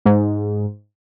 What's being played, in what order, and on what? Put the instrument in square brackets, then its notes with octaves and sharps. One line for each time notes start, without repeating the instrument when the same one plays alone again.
[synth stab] G#2